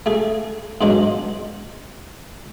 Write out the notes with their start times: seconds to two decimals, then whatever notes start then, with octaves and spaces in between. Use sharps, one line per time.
0.06 A3 G#4
0.81 G#2 B2 F#3 G#3 D4